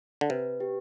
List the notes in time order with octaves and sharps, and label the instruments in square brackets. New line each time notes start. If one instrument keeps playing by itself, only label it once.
[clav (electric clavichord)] D3
[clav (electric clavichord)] C3 [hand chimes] B4
[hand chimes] G4